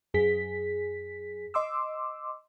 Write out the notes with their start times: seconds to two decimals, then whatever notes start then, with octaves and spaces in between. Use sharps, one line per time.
0.14 F#2 G#4 B6
1.54 D#5 C6 D6 E6